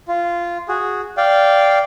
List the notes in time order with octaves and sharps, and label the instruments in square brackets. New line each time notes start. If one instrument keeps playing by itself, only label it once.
[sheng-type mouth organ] F4
F#4 G#4
D5 F5 G5